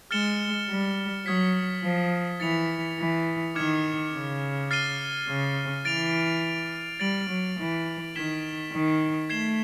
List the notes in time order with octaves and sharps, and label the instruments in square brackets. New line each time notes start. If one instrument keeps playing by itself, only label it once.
[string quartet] G#3 [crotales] F6 A6 C#7 E7 G7
[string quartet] G3
[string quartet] F#3 [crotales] D#6 G#6 B6
[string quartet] F3
[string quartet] E3 [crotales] A6 C#7 F7
[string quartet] E3
[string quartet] D#3 [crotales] D6 F6 G#6 C#7 E7
[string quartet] C#3
[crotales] F6 A6 C7 D#7 G7
[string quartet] C#3
[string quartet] E3 [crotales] A6 D7 F7
[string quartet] G3 [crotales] A6 D7 F#7
[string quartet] F#3
E3
[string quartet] D#3 [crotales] G#6 B6 E7 G7
[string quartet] D#3
[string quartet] A3 [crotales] G#6 C7 E7 G7